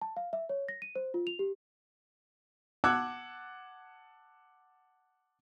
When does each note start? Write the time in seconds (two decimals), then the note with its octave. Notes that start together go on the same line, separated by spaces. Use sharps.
0.02 A5
0.17 F5
0.33 E5
0.49 C#5
0.69 A#6
0.82 D#7
0.96 C5
1.14 F4
1.27 F7
1.39 G4
2.84 F#5 A5 D6 E6 F#6 G#6